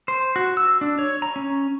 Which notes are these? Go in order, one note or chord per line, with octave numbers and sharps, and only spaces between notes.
C5
F#4
E6
D4
C#5
A#5
C#4